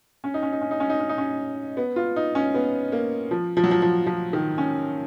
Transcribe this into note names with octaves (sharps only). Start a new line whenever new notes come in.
C#4
D#4
C#4
D#4
C#4
D#4
C#4
D#4
C#4
D#4
C#4
B3
F4
D#4
C#4
B3
A#3
F3
F3
F#3
F3
F3
F3
D#3
C#4